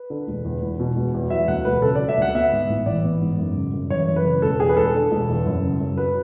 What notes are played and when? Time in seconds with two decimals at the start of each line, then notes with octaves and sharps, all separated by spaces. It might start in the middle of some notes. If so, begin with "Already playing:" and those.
Already playing: B4
0.10 D3
0.27 E1
0.45 E2
0.61 E1
0.79 B2
0.96 E1
1.14 E2
1.30 F#3 E5
1.48 D2 F#5
1.65 E1 B4
1.82 C#3 A4
1.95 F#3 D5
2.09 E5
2.17 D2 F#5
2.34 B3 E5
2.51 G#2
2.69 A1
2.86 E3 D5
3.04 B3
3.21 G#2
3.38 F#2
3.56 C#3
3.73 F#2
3.90 E3 C#5
4.07 F#2
4.16 B4
4.25 C#3
4.42 E1 A4
4.59 E2 G#4
4.69 B4
4.76 E1 A4
4.94 D3
5.11 E1
5.29 E2
5.46 F#2
5.63 C#3
5.80 F#2
5.97 F#3 B4